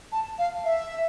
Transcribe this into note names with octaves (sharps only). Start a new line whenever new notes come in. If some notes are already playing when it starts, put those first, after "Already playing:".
A5
F5
E5